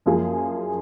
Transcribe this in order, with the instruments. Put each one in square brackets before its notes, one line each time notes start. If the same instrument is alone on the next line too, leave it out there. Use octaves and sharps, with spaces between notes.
[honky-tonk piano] F#2 F3 A#3 F4 G#4